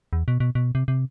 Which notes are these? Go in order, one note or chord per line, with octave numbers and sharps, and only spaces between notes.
E2
B2
B2
B2
C3
C3